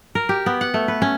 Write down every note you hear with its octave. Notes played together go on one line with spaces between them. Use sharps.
A#4
G4
B3
F#5
A3
B4
C#4